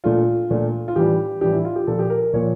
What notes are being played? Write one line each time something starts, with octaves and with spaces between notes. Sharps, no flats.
A#2 A3 D4 F4
A#2 A3 D4
F4
A2 E3 G3 D4 G4
A2 E3 G3 D4 G4
E4
F4
G4
A#2 F3 A#3 A4
G4
A#4
A#4
A#2 F3 A#3 C#5